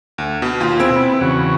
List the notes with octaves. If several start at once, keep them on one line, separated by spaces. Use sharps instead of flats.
D2
B2
D#2 F4
B2 C4 E4 G#4 D7
B3 E4
E2 C#3 F#4